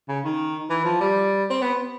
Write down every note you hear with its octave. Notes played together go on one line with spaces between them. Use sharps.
C#3
D#3
E3
F3
G3
C4
B3